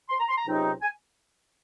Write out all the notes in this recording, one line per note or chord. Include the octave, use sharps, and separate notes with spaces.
C6
A#5
C6
A#5
C#2 C3 F#3 C4 D#4
G#5